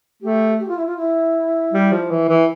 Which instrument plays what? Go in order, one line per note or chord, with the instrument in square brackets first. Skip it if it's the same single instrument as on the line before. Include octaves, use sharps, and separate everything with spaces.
[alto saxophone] A3 [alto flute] G4
[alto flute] G4
F4
E4
F4
E4
[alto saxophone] G3
F3
E3
E3